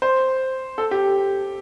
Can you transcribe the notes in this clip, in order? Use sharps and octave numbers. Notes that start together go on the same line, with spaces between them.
C5
A4
G4